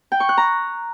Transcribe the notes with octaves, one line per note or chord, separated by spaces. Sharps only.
G5
C#6
F#6
A#5